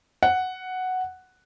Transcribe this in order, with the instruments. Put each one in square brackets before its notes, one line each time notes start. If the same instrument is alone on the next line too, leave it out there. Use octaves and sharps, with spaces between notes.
[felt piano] F#5